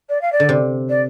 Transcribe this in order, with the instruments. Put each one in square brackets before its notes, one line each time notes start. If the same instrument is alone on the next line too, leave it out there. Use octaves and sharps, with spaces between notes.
[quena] D5
F5
D5
[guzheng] D3
C3
[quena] D5